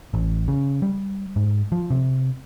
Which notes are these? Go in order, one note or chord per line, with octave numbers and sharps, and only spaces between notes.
A1
C#3
G3
G#2
F3
C3